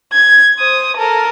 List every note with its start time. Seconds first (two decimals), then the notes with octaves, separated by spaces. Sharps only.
0.13 G#6
0.58 C5 D#6
0.97 A4 A#4